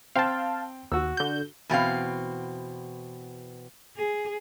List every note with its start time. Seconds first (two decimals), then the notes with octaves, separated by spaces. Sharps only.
0.15 C4 F5 G5 A5
0.92 D#2 F#4 E6
1.17 D3 G6
1.69 E2 B2 C4 F5
3.97 G#4